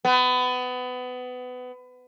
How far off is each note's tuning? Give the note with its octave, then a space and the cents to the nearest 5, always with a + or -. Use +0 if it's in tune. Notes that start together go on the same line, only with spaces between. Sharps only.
B3 +25